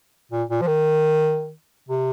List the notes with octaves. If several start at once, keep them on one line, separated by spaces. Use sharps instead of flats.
A#2
A#2
F3
D#3
C3